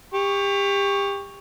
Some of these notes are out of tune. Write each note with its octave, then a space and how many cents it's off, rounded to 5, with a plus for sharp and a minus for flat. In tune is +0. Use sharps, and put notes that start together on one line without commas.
G4 +30 C#6 +0